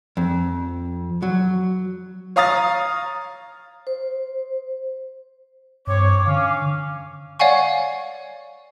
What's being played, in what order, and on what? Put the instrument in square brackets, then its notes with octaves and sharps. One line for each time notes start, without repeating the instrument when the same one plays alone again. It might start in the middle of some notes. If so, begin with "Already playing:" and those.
[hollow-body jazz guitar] F2
F#3
[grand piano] C#5 F5 A#5 D#6 F6 A6
[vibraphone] C5
[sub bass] G2 [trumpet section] C4 C#5 [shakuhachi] D6
[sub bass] D3 [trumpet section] C#4 F5
[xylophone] C#5 D5 F5 F#5 G#5 C#6